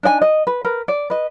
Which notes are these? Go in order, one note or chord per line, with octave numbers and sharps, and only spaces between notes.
D4 D#4 D#5 G#5
D#5
B4
A#4 B4
D5
B4 D#5